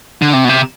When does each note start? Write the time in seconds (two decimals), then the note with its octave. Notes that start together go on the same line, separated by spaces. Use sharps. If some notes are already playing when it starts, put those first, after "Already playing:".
0.22 D3
0.33 C3
0.45 B2
0.49 C3